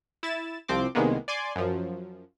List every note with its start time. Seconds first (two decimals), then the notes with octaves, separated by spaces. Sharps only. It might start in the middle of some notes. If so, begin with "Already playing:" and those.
0.23 E4 A6 E7
0.68 C2 F3 C4 C6 D6
0.95 C2 D#3 G#3 A#3 B3
1.28 D5 G#5 C6 D6
1.56 F#2 F3